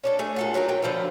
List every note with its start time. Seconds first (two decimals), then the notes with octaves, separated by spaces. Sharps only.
0.04 C#4 D4 A4
0.19 A3 G#4
0.36 A#2 A4 F#5
0.54 F#3 D#4 A4 A#4
0.68 F#3 A#4 G5
0.82 D3 F3 A3 B3